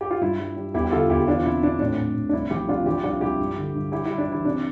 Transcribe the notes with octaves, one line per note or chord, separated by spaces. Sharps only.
G4
F4
G2 E4
G3
G3
E2 E4 G4
G4
D3 F4 A4
E2 E4 G4
G4
E3 D4 F4
C3 E4
C3 D4
A2 D4
A2
A2
D4
C2 E4
F3 E4 G4
C3 D4 F4
F3 E4 G4
C2 D4 F4
C2 E4 G4
G2
D3
G2
G3 E4 G4
G3 E4
D4
E3 E4
C3 D4